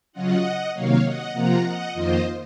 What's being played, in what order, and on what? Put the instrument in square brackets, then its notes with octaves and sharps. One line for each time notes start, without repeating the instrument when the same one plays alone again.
[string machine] C#3 F#3 C#4 F4 D#5 F#5
C3 D#3 F#3 A#3 C#5 F5
D#5 F#5
C3 F3 A#3 F4 F#5 A#5
D#5 F#5
F2 D#3 A#3 F4 C5 D#5